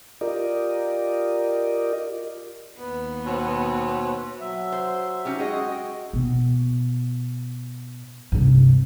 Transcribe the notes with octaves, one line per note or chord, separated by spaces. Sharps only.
F4 G4 A#4 D5 D#5
D#2 B3
B2 C4 C#5
F#3 E5
C5
C#4 D#4 G4
G#3 F#4 G#4 D#5 G5
B2
G2 C3